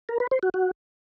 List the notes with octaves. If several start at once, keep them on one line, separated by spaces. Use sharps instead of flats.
A#4
B4
C5
F#4
F#4